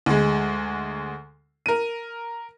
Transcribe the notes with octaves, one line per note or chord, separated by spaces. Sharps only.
D2 G#3
A#4 D#7